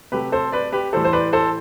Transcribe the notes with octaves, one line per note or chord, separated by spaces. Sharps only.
C3 F#3 A3 G4 B4
A4 C5
B4 D5
G4 B4
A2 E3 G3 A4 C5
C5
B4 D5
A4 C5